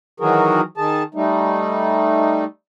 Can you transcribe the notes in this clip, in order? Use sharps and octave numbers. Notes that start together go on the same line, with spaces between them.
D#3 E3 F#3 F#4 G#4 A#4
D#3 G#4 A5
G3 A3 D#4